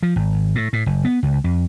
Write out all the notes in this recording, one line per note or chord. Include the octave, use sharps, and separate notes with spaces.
F3
G#1
A2
A2
F#1
B3
C#2
F2